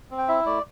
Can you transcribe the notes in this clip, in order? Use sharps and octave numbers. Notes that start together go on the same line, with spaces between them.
C4
G5
E4 E5
A3 D5